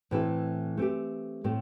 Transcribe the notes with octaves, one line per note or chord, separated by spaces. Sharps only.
A2 E3 C4 E4 A4
A3 C4 G4
A2 A3 C4